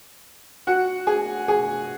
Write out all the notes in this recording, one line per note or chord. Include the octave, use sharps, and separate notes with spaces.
F#4 F#5
G#4 G#5
G#4 G#5